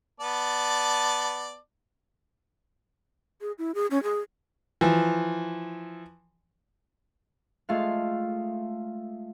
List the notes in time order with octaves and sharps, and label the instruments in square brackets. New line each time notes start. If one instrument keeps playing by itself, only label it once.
[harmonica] B3 D5 A5
[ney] G#4
E4
G#4
C#4
G#4
[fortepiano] E3 F3
[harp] G#3 A3 F4 F5